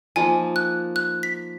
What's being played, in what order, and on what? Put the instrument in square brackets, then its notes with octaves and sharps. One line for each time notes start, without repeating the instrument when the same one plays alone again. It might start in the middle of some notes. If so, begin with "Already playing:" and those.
[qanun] F3 A#3 D#4 [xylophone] G#5
[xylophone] F#6
F#6
B6